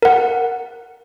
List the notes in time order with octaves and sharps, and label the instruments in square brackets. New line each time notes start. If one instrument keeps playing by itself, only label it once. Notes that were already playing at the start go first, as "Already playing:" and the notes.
[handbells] A#4 F#5